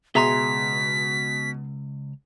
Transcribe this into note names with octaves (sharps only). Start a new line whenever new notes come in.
C#2 B2 G#4 E5 A#5 C6 B6